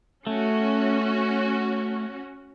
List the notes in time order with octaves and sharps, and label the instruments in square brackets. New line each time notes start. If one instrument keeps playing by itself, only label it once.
[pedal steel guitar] A3 [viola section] C#4 F#4